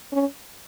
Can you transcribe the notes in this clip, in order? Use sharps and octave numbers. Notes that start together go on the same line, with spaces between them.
C#4